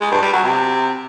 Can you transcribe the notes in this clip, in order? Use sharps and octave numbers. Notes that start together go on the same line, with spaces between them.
G#3
G2
G3
F#3
C3